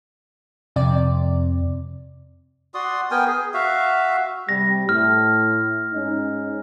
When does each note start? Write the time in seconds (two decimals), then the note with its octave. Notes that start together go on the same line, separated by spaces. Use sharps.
0.76 F2 C3 D5
2.74 F#4 D5 C6 D#6
3.11 B3 A#4 G5 G#5
3.27 G#4
3.54 F#4 E5 F5
4.49 C3 G3 A#6
4.89 A2 F6
5.93 G#2 C#4 D#4